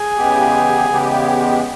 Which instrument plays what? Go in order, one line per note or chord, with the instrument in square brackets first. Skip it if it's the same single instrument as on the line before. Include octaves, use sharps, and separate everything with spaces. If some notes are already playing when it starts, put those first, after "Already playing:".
Already playing: [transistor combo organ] G#4
[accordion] E2 C#3 G#3 B3 G4
E2 C#3 G#3 B3 G4